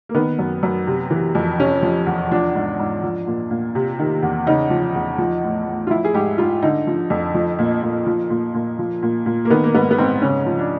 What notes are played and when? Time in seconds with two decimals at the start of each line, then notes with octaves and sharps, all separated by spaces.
0.09 A#3
0.15 D#3 B3
0.39 F#2
0.63 F#2
0.87 C3
1.11 E3
1.35 F2
1.58 C3 C#4
1.82 F3
2.06 E2
2.31 F3 D4
2.55 G#2
2.79 G#2
3.03 F3
3.27 A#2
3.51 A#2
3.75 C3
3.99 D#3
4.23 E2
4.47 C#3 D#4
4.70 F3
4.95 E2
5.18 F3
5.43 A2
5.67 A2
5.87 F4
5.90 F3 E4
6.05 G#4
6.14 G#2 G4
6.38 G#2 F4
6.62 D3 D#4
6.87 F3
7.10 F2
7.35 F3
7.59 A#2
7.83 A#2
8.06 F3
8.30 A#2
8.54 A#2
8.79 F3
9.03 A#2
9.26 A#2
9.45 A#3
9.50 D#3 B3
9.64 A#3
9.74 G#2 B3
9.91 B3
9.98 G#2 C4
10.22 C#3 C#4
10.46 F3
10.59 D4